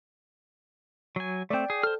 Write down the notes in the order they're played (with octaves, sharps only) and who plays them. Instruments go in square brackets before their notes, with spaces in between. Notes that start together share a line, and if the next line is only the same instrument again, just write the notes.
[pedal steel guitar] F#3 G#5
[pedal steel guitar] A3 C4 [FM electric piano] D5 G5
[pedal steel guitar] G#4
[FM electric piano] A4 [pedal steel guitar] C5 F6